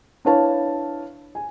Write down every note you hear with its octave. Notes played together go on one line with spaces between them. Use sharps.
D4 E4 B4 C#5 F5 A5
G#5